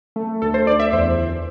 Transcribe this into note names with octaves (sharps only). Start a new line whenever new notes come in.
A3
D2 A4
C5
D2 D5
E5
E2 C5
E2